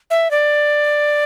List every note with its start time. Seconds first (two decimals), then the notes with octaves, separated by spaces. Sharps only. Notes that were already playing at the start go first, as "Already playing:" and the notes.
0.11 E5
0.31 D5